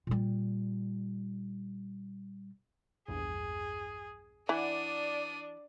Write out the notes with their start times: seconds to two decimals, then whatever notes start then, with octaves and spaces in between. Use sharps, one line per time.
0.07 A#2 G3
3.08 A#1 E2 G2 G#4
4.49 E3 D4 D5 F#5 D#6 F#6